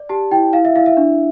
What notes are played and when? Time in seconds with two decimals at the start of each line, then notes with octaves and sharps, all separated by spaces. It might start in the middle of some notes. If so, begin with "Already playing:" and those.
Already playing: D5
0.09 G4 A5
0.31 E4 G5
0.53 E4 F5
0.65 E5
0.76 E4 F5
0.86 E5
0.97 D4